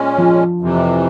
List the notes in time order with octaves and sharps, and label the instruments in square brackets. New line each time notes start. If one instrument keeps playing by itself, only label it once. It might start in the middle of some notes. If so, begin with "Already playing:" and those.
Already playing: [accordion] A#2 G#3 C#4
[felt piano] F3
[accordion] F2 C3 E3